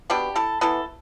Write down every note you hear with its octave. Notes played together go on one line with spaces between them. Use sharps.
B2 B3 D4 G4
E4 A4
E3 B3 E4 A4